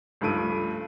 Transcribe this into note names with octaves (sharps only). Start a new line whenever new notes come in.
C#2 G2 F3 A3 D7 D#7